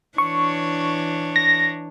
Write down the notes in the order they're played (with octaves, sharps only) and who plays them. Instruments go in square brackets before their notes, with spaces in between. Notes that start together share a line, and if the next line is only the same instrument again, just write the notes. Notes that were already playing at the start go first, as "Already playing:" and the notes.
[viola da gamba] E3 D4 C#5 [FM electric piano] C#6
[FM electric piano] A#6